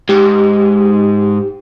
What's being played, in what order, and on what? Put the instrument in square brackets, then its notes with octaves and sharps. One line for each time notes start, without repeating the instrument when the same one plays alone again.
[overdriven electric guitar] G#2 [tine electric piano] G4